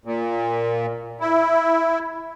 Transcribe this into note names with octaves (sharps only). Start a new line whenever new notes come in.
A#2
E4